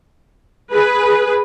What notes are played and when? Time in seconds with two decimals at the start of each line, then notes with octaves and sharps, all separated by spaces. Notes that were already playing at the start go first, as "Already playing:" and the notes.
0.72 G#4 B4